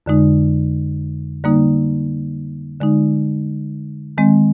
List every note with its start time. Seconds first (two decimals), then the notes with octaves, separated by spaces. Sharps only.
0.06 F2 D3 G#3 D#4
1.44 D3 G3 A#3 D#4
2.81 D3 G#3 D#4
4.18 D#3 G#3 C4